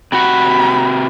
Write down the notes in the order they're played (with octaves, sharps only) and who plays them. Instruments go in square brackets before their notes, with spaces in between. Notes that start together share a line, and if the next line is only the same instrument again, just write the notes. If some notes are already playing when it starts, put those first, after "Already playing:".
[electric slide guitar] C3 F#4 F#5 [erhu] B5